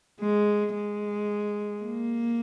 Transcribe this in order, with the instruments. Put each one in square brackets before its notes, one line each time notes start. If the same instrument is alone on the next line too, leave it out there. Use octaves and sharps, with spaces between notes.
[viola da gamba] G#3
G#3
A#3